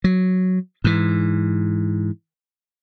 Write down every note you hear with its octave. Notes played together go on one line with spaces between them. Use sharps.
F#3
G#2 E3